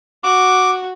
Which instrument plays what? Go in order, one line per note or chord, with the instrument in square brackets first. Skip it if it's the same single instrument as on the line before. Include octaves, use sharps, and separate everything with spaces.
[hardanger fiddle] F#4 [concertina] D6